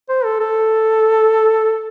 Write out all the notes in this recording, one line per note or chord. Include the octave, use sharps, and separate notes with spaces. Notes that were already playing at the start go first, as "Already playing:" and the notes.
C5
A4
A4